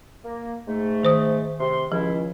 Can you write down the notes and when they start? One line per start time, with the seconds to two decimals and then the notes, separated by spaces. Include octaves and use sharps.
0.24 A#3
0.67 G#2 A3
1.03 D#3 C5 D#6
1.60 C3 C6
1.92 C#2 F3 E4